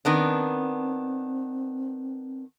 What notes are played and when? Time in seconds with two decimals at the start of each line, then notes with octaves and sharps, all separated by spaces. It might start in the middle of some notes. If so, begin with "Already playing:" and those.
0.05 D#3 B3 C4 D4